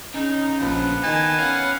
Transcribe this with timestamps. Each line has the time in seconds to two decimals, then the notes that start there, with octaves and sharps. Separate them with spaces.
0.14 C#3 D#4
0.61 A#1 F3 B3
1.04 D#3 D#4 G#5 A5
1.39 C#4 F5 F#5